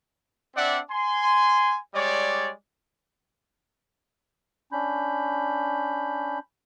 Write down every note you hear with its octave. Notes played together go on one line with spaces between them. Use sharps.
C4 D4 D5 E5 F#5
G#5 C6
G3 G#3 C#5 D5
C#4 D4 B5 G6